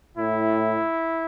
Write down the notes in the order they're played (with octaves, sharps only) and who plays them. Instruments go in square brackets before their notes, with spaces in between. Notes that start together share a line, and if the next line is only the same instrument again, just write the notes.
[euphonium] A2 [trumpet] E4